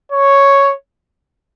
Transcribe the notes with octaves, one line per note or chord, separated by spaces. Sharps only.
C#5